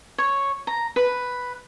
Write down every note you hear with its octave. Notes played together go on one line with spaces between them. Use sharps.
C#5
A#5
B4